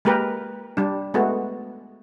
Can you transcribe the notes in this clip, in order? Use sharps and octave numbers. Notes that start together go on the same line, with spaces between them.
G#3 A#3 G4 A#4 B4
G3 D4
G#3 A3 B3 F#4